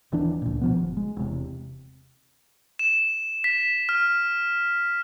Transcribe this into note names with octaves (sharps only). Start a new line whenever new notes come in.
D#1 E3 D4
C#2 A#2
B2 F3 B3
G1
G#3
E1 C3
E7
B6
F6